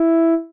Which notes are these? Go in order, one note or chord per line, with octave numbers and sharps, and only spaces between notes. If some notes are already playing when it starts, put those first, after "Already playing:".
Already playing: E4